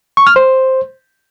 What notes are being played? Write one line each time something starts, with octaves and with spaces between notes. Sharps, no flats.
C#6
F6
C5